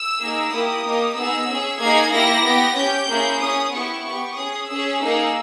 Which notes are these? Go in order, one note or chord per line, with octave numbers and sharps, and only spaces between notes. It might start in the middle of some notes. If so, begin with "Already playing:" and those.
Already playing: E6
A#3 D#4 G#4
A#3 E4 G4 D#6
A#3 D#4 G4
B3 D#4 G#4 E6
C#4 G#4
A#3 D#4 G#4 G#6
A#3 E4 G4 A#6
B3 G4
C#4 G4 G6
A#3 C#4 E4 G#4
C#4 G#4 D#6
B3 E4 G4 C#6
B3 G4 C#6
C#4 G#4 D#6
C#4 G#4 E6
A#3 D#4 G#4